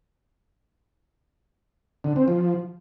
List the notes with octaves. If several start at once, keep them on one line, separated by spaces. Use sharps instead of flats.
D3
C4
F3